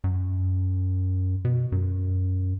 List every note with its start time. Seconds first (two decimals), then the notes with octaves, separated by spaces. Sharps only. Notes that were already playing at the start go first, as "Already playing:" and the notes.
0.04 F#2
1.45 B2
1.72 F#2